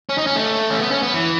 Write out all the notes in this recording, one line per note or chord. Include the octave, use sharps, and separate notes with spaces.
C#4
D#4
C#4
A3
C#4
B3
C#4
B3
E3